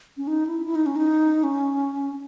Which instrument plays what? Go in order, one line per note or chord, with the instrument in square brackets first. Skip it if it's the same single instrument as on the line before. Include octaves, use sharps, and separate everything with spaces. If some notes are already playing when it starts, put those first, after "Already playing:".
[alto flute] C#4
D#4
E4
E4
D#4
C#4
D#4
C#4